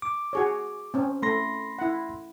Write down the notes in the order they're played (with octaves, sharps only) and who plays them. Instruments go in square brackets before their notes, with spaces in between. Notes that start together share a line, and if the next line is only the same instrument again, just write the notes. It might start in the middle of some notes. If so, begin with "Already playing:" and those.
[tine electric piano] D6
[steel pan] F#4 G#4 C#5
C4 C#4
[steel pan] A3 [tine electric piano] B5 C6 A#6
[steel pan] E4 F#5